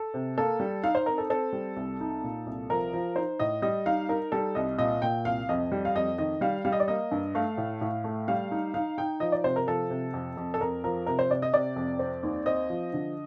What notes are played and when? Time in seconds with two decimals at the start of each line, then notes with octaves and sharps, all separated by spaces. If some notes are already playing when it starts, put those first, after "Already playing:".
Already playing: A4
0.14 C3
0.37 A#3 A4
0.60 G3
0.84 D#4 F5
0.95 C5
1.06 C4 A#4
1.18 A4
1.30 C4 A4
1.53 G3
1.77 C2
2.00 D#4
2.23 A#2
2.47 C2
2.70 F3 A#4
2.93 F3
3.16 D#4 C5
3.40 A2 D#5
3.62 G3 D#5
3.86 D#4 F5
4.09 D#4 A#4
4.32 G3 A4
4.55 C2 D#5
4.78 A#2 D#5
5.02 A#2 G5
5.25 C2 F5
5.49 F2 D#5
5.72 G3
5.85 F5
5.95 F2 D#5
6.18 D#3 D#5
6.41 G3 F5
6.65 G3 F5
6.72 D#5
6.80 D5
6.88 A#3 D#5
7.11 G2
7.35 A3 F5
7.57 A2
7.81 A2
8.04 A3
8.28 G3 F5
8.51 D#4
8.74 D#4 F5
8.98 D#4 G5
9.20 F3 D#5
9.32 D5
9.44 C3 C5
9.56 A#4
9.67 F3 A4
9.90 C3
10.14 F2
10.37 F2
10.54 A4
10.60 F2 A#4
10.84 F3 A#4
11.06 C3 A#4
11.19 C5
11.30 C3 D5
11.42 D#5
11.53 C3 D5
11.76 F2
11.99 C4
12.23 D#2
12.46 C4 D#5
12.70 F3
12.94 D3